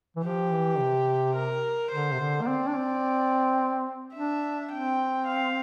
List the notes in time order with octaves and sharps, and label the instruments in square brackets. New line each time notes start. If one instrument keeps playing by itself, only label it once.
[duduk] E3
[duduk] F3 [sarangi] G4
[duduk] E3
C3
[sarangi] A#4
[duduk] D3 [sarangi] C5
[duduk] C3
D3
A#3
[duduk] C4 [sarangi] D5
[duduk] D4
C4
[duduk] D4 [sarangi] E5
[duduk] C4 [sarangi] G5
[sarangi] F5